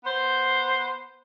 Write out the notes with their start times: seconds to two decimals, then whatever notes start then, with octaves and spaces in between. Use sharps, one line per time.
0.04 B3 C5